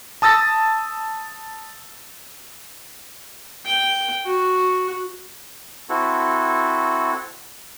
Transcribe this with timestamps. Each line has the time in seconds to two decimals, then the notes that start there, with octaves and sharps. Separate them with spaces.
0.22 A5 D#6 E6 A6 A#6
3.66 G5
4.26 F#4
5.89 C4 E4 F#4 A4